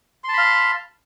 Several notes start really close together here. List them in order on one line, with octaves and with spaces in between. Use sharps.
C6 A5 B5 F5